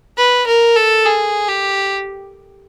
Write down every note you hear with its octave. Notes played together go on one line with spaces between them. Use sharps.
B4
A#4
A4
G#4
G4